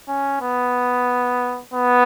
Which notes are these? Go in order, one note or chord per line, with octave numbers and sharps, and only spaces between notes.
C#4
B3
B3